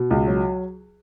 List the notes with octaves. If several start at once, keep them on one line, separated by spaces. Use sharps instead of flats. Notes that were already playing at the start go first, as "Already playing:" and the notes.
Already playing: B2
C#2
F#3